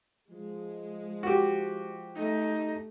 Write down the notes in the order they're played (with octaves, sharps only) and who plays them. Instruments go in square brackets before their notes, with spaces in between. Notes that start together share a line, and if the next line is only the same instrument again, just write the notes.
[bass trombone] F3 [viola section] G#3
[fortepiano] F#4 G4
[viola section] A3 [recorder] D#4